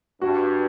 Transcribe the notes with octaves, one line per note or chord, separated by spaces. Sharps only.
G2 F#4